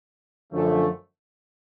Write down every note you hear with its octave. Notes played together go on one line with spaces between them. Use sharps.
F#2 D3 F3 A3